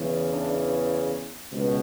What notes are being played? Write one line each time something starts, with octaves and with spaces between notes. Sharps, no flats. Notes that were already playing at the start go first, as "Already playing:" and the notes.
Already playing: E2 C#3 E3
D4
C#2 B2